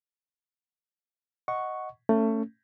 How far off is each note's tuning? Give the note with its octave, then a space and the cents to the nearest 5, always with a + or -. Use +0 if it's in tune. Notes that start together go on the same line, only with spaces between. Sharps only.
D#5 +0 F#5 +0 C#6 +0
A3 +20 C#4 +0